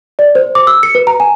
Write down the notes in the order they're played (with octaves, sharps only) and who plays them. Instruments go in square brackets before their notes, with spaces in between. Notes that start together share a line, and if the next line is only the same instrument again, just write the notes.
[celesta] D5
C5
D6
E6
C#7
B4
A#5
G#5